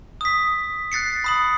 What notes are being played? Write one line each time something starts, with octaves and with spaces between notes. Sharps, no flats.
D#6 B6
F#6 A6 C7 C#7
B5 D#6 F#7